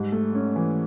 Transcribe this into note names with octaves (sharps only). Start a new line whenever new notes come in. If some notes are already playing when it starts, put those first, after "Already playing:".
Already playing: G#2 G3
A3
C#4
E3